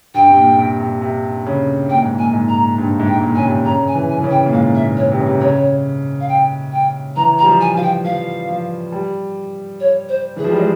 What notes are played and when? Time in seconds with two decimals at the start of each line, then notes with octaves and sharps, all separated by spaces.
0.14 G2 G5
0.29 C3
0.36 A#2
0.57 C3
0.80 C3
1.01 C3
1.46 C#3
1.89 A#2 G5
2.02 G#2
2.15 A#2 G#5
2.33 G#2
2.49 A#5
2.78 G2
3.00 G#2
3.07 G5
3.17 G#2
3.21 A#2
3.35 C#3 G#5
3.44 C3
3.65 C#3 A#5
3.88 G#5
3.95 E3
4.09 G#5
4.19 E3
4.24 C#3
4.31 G5
4.46 A#2
4.53 G#2 F5
4.75 E5
4.83 A#2
4.97 C#5
5.12 C3
5.19 C#3
5.26 C3
5.41 C#3 C#5
6.20 F5
6.28 G5
6.72 G5
7.16 E3 A#5
7.39 G3 A#5
7.46 F3
7.61 G#5
7.75 F3 F5
7.82 G5
8.04 F3 F5
8.49 F3
8.92 G3
9.80 C#5
10.09 C5
10.36 E3 G#4
10.44 F3
10.51 G3
10.59 G#3